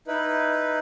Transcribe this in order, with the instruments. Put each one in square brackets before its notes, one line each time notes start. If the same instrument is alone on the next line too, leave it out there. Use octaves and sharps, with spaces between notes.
[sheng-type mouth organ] D#4 E4 B4